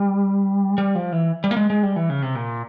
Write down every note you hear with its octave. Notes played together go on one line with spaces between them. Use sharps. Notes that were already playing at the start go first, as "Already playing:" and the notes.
Already playing: G3
G3
F3
E3
G3
A#3
G#3
G#3
G3
E3
C#3
C3
A#2